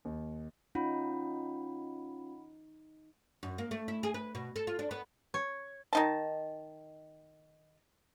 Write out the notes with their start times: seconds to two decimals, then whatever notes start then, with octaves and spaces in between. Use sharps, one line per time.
0.05 D#2
0.75 C#4 D#4 F4 F#5 B5
3.43 F#2
3.58 A#3
3.71 A3
3.88 E4
4.03 G#4
4.14 B4
4.35 B2
4.56 A4
4.67 F4
4.79 D4
4.91 B3
5.34 C#5
5.93 D#3 D#4 A5